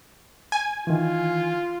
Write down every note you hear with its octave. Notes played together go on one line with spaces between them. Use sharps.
G#5
D#3 E3 F4